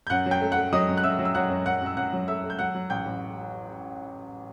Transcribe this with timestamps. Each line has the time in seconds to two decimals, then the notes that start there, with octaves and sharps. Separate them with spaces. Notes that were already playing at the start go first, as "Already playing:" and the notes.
0.07 G6
0.10 F#2 F#5 F#6
0.26 F#3
0.31 G5 G6
0.41 A3
0.52 A3 F#5 F#6
0.73 F#3 D#5 D#6
0.88 F#2
0.97 F#6
1.04 F#2 E5 E6
1.19 F#3
1.25 E6
1.35 F#3 F#5 F#6
1.50 F#2
1.66 F#2 F#5 F#6
1.81 F#2 E6
1.97 F#2 F#5 F#6
2.13 F#3
2.28 A3 E5 E6
2.43 A3
2.50 G6
2.59 F#3 F#5 F#6
2.75 F#3
2.90 A1 G5 G6
3.06 A1